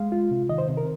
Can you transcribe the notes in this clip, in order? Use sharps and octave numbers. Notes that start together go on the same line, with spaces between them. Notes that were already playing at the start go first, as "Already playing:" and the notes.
Already playing: G#3 F5
F4
C3
D#3 D#5
C5
C3
A#4